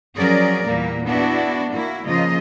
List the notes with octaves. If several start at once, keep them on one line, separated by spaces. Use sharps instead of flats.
F3 F#3 C#4 G#4 A#4 D5
E2 A#2 G3 A#3
B3 D4 E4 F#4
A#3 E4 F#4
C#3 F3 A#3 F4 D#5